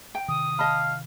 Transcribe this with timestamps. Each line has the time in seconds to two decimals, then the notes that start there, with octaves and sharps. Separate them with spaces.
0.15 G5
0.28 C3 D#3 D#6
0.59 D#5 F5 A5 B5